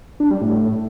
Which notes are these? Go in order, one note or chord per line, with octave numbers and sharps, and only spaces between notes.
D4
G3
A2